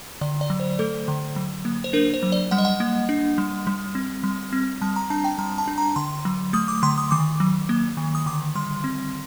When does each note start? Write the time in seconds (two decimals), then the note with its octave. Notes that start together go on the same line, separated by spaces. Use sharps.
0.21 D3 D5
0.41 D5
0.50 F#3
0.60 C5
0.79 A3 A4
1.08 D3
1.36 F#3
1.65 A#3
1.84 C5
1.93 D4 A#4
2.14 C5
2.23 F#3
2.32 D5
2.51 G3 F#5
2.58 D#5
2.65 F#5
2.80 A#3
3.09 D4
3.38 G3
3.67 G3
3.95 C4
4.23 G3
4.53 C4
4.82 G3 A5
4.96 A#5
5.10 D4 A5
5.24 G5
5.38 G3 A#5
5.58 A5
5.68 D4
5.78 A#5
5.96 D3 C6
6.25 F#3
6.53 A3 D#6
6.68 D6
6.83 D3 C6
6.98 D#6
7.11 D#3 D6
7.40 F#3
7.69 A#3
7.97 D#3
8.15 D#6
8.26 D3 D6
8.55 G3 C6
8.84 C4